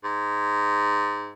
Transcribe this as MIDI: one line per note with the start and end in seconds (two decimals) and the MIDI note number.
0.04 1.31 44